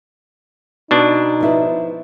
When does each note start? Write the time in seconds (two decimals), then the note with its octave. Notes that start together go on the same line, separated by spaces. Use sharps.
0.91 B2 D4 D#4
1.41 F3 E4 B4